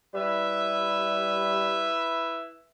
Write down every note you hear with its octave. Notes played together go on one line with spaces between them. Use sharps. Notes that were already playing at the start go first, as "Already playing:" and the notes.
G3 E4 B4 E5